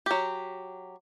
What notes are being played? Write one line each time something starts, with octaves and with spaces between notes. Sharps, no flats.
F#3 G4